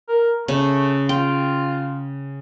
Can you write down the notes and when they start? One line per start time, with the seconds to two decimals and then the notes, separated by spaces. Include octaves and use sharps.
0.08 A#4
0.48 C#3 A3
1.09 F4 G5